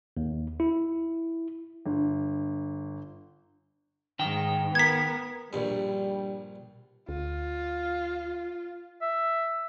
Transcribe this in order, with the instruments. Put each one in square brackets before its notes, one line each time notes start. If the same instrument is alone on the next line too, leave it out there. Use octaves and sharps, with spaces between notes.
[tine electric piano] D#2
E4
[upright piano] G1
[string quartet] G#2 [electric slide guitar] D#3 G5
[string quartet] B3 A#4 [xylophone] G#6 B6
[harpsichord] A#1 G2 [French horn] G3
[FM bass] D2 [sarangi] F4
[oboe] E5